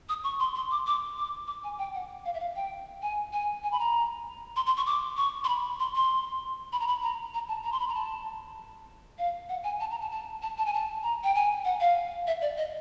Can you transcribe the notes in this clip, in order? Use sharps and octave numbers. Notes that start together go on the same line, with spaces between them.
D#6
C#6
C6
C6
D6
D6
D6
D6
G#5
G5
F#5
F5
E5
F5
G5
G#5
G#5
G#5
B5
A#5
C6
C6
C#6
D6
C#6
C6
B5
C6
C6
B5
A#5
B5
A#5
A#5
A5
A#5
C6
B5
A#5
A5
F5
F#5
G#5
A5
A#5
A5
A5
A5
A5
G#5
A5
A#5
G5
G#5
F#5
F5
E5
D5
D#5